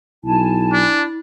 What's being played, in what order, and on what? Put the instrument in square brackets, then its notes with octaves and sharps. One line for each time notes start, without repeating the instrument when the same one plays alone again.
[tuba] B1 [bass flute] E4 [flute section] G#5 A5
[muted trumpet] D4